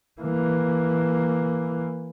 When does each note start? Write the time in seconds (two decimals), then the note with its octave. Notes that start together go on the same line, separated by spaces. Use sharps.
0.21 E3 A#3